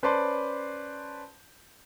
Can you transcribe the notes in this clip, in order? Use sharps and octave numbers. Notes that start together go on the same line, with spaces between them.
C#4 B4 C5 D5 A5 C6